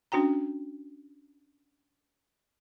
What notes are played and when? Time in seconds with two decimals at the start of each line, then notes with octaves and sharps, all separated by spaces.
0.12 C#4 D4 F#4 G5 A#5